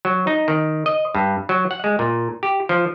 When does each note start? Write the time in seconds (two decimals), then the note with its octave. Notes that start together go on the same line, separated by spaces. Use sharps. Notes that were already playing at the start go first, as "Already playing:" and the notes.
0.05 F#3
0.27 D#4
0.48 D#3
0.86 D#5
1.15 G2
1.49 F#3
1.71 F#5
1.84 G#3
1.99 A#2
2.43 G4
2.69 F3